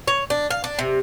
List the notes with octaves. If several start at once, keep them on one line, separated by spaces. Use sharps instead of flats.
C#5
D4
F5
D4
C3